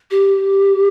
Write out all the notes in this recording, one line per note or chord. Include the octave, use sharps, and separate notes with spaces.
G4